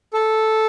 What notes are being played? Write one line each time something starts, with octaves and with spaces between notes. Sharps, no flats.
A4